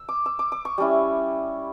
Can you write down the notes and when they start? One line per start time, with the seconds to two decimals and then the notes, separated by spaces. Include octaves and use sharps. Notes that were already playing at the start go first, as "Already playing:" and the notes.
Already playing: E6
0.09 D6
0.26 E6
0.39 D6
0.52 D6
0.65 C#6
0.78 G3 C#4 E4